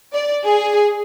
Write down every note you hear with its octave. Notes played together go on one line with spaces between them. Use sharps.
D5
G#4